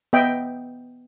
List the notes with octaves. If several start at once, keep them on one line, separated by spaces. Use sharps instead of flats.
B3 D#5 E5 G5